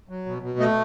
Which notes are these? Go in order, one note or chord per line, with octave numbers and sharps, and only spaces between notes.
F#3
B2
B2
A3 D#5